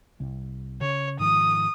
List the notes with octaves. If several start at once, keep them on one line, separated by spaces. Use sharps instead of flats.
C2
C#3 C#5
G#2 D#3 F3 D#6